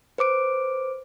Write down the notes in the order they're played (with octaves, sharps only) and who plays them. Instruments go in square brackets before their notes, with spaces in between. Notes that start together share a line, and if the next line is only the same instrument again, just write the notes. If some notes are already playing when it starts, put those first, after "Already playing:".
[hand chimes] B4 C5 D6 D7